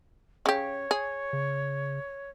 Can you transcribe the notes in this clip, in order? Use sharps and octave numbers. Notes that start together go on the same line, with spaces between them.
C#3 G4 C#5
G#4
C#3